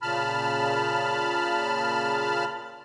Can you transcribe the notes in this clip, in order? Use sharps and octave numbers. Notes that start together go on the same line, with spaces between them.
A#2 C#3 A5 B5 F6